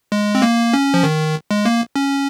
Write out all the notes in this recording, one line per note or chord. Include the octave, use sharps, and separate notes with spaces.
G#3
C4
A#3
C#4
F3
D#3
G#3
A#3
C#4